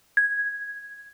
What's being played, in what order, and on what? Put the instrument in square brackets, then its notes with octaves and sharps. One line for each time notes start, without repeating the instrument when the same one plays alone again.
[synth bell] G#6